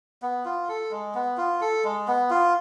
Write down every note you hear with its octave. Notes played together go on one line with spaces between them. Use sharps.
B3
F4
A4
G#3
B3
F4
A4
G#3
B3
F4